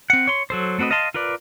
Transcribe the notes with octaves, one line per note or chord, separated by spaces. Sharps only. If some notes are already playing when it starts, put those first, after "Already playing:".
C4 F#5
C#5 C6
F#3 A4 C5
A3 C4 F#4 B4 D#5
D#5 F5 A5 C6
F4 A#4 B4 D5